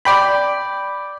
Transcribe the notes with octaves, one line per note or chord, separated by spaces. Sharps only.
D5 G5 B5